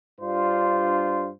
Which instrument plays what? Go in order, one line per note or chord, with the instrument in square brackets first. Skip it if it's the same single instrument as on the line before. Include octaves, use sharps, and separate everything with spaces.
[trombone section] G2 D4 F4 C5